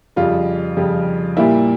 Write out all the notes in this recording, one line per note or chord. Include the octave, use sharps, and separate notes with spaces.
F2 C#3 G3 F4
F2 C#3 G3
A#2 G3 A#3 E4